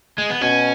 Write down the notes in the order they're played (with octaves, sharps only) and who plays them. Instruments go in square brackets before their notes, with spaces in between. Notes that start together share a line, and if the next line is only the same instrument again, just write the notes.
[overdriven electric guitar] G#3
B3
[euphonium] B2 [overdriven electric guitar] C#4